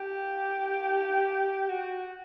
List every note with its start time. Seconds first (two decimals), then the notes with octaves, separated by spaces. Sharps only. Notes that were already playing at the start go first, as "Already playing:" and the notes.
Already playing: G4
1.69 F#4